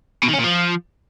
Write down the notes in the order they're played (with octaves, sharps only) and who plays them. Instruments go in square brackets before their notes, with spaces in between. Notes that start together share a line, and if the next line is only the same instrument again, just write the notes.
[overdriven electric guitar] B2
D#3
C#4
A#2
F3